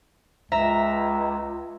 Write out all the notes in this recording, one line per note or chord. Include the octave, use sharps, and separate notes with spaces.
C#2 E5 A#5